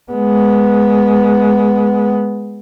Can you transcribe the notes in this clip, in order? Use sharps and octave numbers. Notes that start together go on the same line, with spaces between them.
G#3 B3